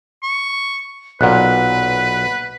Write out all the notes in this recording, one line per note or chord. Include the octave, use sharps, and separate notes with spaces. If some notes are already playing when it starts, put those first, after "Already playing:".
C#6
B1 A#2 B4 F#5 F#6